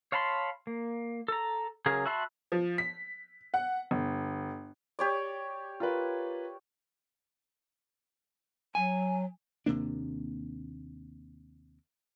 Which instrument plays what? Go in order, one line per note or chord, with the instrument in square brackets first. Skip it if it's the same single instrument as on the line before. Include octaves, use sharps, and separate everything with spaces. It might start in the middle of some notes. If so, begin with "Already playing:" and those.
[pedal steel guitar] C#5 F5 A5 B5 C6
A#3
A4 A#5
C#3 F#3 G#4 A#4 F5
F#4 E5 A5 B5 C6
[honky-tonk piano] F3
B6
F#5
G1
[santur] G4 C#5 D5
[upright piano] F4 A#4 B4
[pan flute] F#3 [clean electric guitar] G#5
[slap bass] D#2 C3 A#3 D4